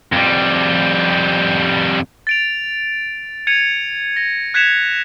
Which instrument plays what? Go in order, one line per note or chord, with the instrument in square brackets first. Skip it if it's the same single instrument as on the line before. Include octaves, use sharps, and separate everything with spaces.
[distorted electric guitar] F2 G3
[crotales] A6 D7 F7
G#6 C#7 D#7 F7
A#6
F#6 G#6 B6 C#7 E7 F7